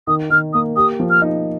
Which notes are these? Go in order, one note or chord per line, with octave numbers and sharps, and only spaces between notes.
D#3 D#6
D#3 F6
A#3 D#6
G4 D#6
F3
F6
D#4